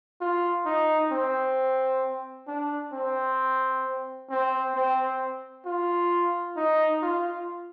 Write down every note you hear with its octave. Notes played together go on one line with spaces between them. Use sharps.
F4
D#4
C4
D4
C4
C4
C4
F4
D#4
F4